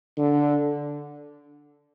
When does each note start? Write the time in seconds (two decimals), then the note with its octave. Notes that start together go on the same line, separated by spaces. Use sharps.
0.18 D3